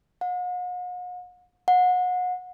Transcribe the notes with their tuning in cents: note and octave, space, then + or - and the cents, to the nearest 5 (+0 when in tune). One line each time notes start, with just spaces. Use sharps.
F#5 -45
F#5 -30